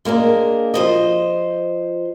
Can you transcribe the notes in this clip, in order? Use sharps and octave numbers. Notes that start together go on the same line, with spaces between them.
G#3 A#3 C#4 D4
F3 C5 D#5